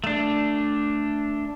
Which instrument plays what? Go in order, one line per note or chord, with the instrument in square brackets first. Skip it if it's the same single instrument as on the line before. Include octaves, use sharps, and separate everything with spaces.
[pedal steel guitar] A3 D4